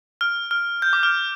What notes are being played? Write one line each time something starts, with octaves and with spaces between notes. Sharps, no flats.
F6
F6
G6
D6
F6